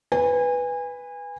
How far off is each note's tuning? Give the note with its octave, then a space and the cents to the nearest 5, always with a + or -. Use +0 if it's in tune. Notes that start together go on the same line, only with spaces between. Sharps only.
B4 +0 G#5 -30